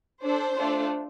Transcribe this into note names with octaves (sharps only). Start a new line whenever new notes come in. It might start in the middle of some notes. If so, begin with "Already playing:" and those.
D4 A4 C5
A3 D4 F4 A4